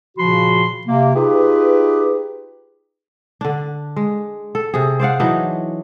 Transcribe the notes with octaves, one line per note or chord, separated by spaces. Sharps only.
A#2 C#3 F3 F#4 B5 C6
C3 A#3
D#4 F4 G4 G#4 B4
D3 D4
G#3
A4
C3 G#4
C5 D5 F5 F#5
E3 F#3 D4 D#4